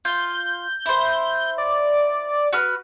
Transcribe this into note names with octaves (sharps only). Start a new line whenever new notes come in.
F4 G6
E4 C5
D5
F#4 B4 F6